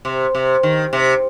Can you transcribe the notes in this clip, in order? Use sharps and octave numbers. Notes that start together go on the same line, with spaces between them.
C3
C3
D#3
C3